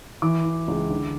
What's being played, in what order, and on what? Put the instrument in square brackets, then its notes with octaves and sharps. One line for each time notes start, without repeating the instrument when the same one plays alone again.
[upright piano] E3 D6
E3
C#2
D3